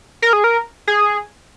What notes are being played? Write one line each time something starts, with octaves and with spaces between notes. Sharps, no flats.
A#4
G#4
A#4
G#4